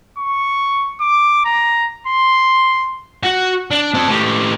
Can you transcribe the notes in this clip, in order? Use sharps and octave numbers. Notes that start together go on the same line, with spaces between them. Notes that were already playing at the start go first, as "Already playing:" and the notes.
C#6
D6
A#5
C6
F#4
D4
C4 A5
A2 G4